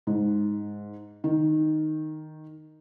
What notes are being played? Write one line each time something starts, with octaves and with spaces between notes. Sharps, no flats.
G#2
D#3